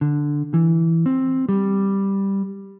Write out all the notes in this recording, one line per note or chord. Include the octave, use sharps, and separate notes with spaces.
D3
E3
C4
G3